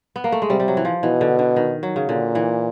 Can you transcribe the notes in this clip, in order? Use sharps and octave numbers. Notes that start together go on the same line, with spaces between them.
B3
A#3
A3
G#3
C3 G3
G3
F#3
E3
F3
B2 E3
D3
D3
D#3
F#3
C#3
A#2 D3
E3